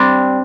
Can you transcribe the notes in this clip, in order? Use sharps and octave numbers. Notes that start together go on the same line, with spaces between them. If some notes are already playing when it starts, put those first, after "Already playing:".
Already playing: G3 C4 D4